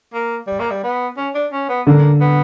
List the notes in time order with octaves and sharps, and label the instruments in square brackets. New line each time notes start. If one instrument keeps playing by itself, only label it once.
[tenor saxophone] A#3
G3
A#3
G3
B3
C#4
D4
C#4
B3
[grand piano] D3 [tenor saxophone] A#3
[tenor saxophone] B3